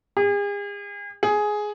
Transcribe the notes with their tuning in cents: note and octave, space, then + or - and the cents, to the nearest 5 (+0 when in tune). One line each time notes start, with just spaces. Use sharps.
G#4 -40
G#4 +10